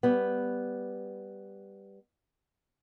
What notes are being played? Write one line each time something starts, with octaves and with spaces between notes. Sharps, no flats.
G3 B3